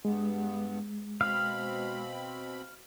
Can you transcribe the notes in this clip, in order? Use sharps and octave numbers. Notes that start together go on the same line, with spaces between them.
G2 G#3 B3
B2 C4 F5 B5